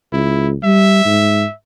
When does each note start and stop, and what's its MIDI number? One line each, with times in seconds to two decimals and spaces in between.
0.13 0.55 37
0.13 0.48 64
0.64 1.05 55
0.64 1.54 76
1.05 1.44 44